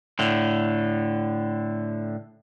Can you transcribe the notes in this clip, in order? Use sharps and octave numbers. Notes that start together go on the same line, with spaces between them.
A2 D3